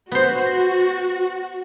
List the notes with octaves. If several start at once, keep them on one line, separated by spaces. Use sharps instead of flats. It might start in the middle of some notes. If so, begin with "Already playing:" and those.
B3 F#4 C5